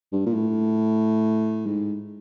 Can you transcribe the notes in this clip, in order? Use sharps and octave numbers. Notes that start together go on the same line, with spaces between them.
G2
A#2
A2
G#2